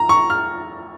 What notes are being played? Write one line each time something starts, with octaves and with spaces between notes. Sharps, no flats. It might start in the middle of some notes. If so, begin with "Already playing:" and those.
Already playing: A#5
C#6
F6